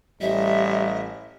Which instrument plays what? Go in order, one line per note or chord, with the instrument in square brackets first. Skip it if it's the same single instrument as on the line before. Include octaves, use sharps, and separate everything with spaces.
[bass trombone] A1 [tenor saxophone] G3 [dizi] D#5 [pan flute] E5